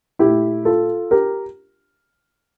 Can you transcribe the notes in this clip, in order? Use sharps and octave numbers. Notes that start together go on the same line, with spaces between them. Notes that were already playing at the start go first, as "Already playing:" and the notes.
A#2 A3 E4 G4
F4 A4
G4 A#4